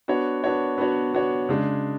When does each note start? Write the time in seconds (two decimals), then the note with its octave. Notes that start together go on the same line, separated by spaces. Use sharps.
0.08 B3 D4 F#4 C#5
0.44 B3 D4 F#4 C#5
0.78 B3 D4 F#4 C#5
1.14 B3 D4 F#4 C#5
1.49 C#3 G#3 D4 G#4